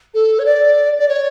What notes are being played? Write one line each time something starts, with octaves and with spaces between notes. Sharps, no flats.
A4
C#5
D5
D5
C#5